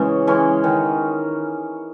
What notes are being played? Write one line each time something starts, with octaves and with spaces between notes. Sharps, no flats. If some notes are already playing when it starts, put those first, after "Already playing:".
Already playing: C#3 E3 G#3 C#4
E3 G#3 C#4
D#3